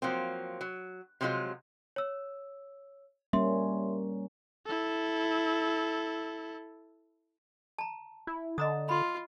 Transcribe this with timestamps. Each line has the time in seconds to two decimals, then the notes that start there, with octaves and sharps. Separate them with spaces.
0.02 F3 F#3 A#3 C4
0.61 F#3
1.21 C3 F3 F#3 G#3 F4
1.96 C#5 E6
3.33 G3 A#3 C#4 E5 C6
4.66 E4 A4
7.78 A5 A#5
8.27 E4
8.58 D3 D#5 A#5 D#6
8.89 F4 B5 C6